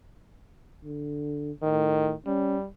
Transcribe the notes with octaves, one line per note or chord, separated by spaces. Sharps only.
D3
A2 D#3
G3 C#4